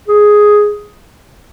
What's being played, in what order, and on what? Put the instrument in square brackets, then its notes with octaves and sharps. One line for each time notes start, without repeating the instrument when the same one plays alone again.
[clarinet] G#4